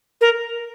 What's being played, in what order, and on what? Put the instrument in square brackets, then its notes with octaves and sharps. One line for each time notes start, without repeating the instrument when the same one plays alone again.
[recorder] A#4